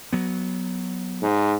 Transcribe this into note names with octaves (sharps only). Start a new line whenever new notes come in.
F#3 B3
G#2